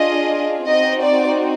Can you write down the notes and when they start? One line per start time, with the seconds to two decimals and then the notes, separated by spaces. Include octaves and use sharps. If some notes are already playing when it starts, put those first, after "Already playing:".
Already playing: D4 F4 G#4 D#5
0.70 C4 D#4 F#4 D#5
1.04 D5